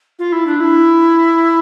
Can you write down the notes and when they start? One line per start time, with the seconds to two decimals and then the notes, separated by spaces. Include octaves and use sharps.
0.19 F4
0.32 E4
0.47 D4
0.60 E4